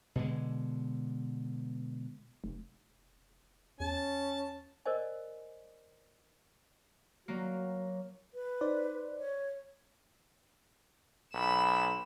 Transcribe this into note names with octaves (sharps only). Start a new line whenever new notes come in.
B2 D3 G#3
F1
E2 C#4 A5
A#4 C5 D5 D#5 G#5
F#3 A#3 F#4
B4
D#4 C5 D5
C#5
B1 B5 E7